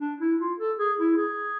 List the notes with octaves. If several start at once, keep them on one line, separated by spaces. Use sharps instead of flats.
D4
E4
F4
A4
G#4
E4
G#4